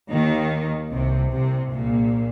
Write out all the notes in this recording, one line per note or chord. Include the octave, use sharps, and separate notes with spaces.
D#2 D#3
C2 C3
C2 C3
A#1 A#2